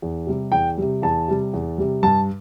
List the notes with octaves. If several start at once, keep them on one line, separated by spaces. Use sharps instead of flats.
E2
C3 G3
E2 G5
C3 G3
E2 A5
C3 G3
E2
C3 G3
G2 A5